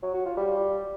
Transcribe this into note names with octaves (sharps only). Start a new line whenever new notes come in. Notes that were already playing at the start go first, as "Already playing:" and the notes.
F#3
F#4
F4
G3